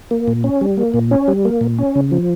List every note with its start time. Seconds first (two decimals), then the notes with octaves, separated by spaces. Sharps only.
0.11 A#3
0.28 A#2
0.44 C#4
0.61 G3
0.77 A#3
0.94 A#2
1.11 C#4
1.28 G3
1.45 A#3
1.61 A#2
1.78 C#4
1.95 C#3
2.11 F3